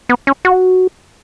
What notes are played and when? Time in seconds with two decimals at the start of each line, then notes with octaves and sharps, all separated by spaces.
0.09 B3
0.27 C#4
0.45 F#4